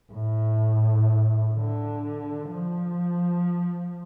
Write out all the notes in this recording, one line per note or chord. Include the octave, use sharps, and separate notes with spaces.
A2
D3
F3